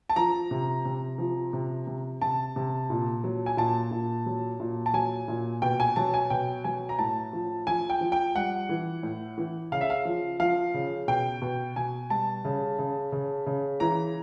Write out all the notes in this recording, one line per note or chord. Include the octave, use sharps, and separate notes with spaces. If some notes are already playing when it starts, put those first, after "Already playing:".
A5
F3 A#5
C3
C3
F3
C3
C3
C3 A5
C3
A#2
F#3
G#5
A#2 A5
A#2
F#3
A#2
A5
F#3 G#5
A#2
B2 G5
G#5
F#3 A5
G#5
B2 G5
F#3 G#5
A#5
A2 A5
F3
F3 G#5
G5
F3
G5
G3 F#5
E3
A2
E3
C#3 F5
E5
F5
F3
F3 F5
C#3
B2 G5
B2
B2 G#5
G3 A5
C#3
C#3
C#3
C#3
E3 A#5